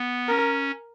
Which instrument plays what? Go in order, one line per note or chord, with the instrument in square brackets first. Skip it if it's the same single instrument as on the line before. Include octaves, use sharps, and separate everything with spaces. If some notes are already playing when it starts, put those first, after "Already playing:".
Already playing: [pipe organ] B3
[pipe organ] C#4 [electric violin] A#4